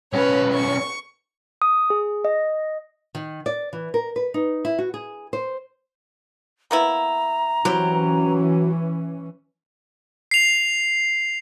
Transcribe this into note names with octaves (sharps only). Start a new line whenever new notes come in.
B1 C#4 B4 C#5
C#6
D#6
G#4
D#5
D#3
D5
E3
A#4
B4
D#4
E4
F#4
G#4
C5
A#3 B3 E4 A#5
E3 F#3 C4 C#4 E4 G4
C7 F7